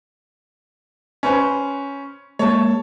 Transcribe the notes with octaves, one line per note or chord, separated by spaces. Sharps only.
C#4 B4 C5
G#3 A#3 C#5 A5